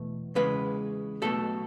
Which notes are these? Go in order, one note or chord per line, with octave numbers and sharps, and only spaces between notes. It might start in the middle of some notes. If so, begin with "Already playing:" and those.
Already playing: E2 B2 A3
E2 C#3 G#3 B4
B1 B2 A3 A4